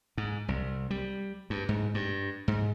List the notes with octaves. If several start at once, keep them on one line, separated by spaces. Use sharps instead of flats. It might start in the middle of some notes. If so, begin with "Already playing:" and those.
G#2
C2
G3
G2
G#2
G2
G#2